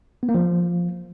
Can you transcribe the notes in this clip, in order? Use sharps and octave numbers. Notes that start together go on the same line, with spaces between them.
B3
A#3
F3